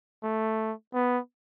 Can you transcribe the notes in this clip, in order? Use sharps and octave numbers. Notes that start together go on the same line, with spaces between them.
A3
B3